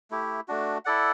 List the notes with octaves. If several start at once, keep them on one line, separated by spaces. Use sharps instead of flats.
A3 E4 G4
A3 D4 F#4
E4 A4 D5 F#5